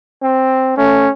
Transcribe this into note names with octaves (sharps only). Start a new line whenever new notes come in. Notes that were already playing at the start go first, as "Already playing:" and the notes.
C4
A3 C#4